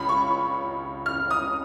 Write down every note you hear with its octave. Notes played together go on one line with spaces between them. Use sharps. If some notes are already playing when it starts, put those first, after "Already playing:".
Already playing: C#2 C#3 B5
C#6
F6
D#6